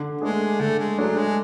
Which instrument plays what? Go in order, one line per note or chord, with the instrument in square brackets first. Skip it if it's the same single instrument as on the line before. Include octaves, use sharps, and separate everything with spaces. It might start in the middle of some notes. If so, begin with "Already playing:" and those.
Already playing: [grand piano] D3
[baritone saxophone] G#3 [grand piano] A3 D4 G#4
[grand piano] D3 [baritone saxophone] A3
[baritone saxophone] G#3
[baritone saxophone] F#3 [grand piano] A3 D4 G#4
[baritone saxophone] G#3